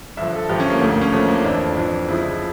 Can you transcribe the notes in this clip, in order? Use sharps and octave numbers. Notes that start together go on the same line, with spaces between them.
G2 D3 F3 E5
A4
G2 D3 F3 G4
C#4
A#3
D2 D3 F3 A3
A#3
C#4
D2 D3 F3 A3
A#3
F2 E3 D4
F2 E3
C#2 C#3 F3 E4